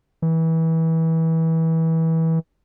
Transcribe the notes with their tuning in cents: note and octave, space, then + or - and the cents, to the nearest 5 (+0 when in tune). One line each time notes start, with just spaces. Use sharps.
E3 -25